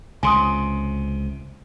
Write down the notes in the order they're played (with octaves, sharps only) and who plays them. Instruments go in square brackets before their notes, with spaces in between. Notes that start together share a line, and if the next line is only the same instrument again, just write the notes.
[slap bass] C#2 C3 [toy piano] G#5 C6 D#6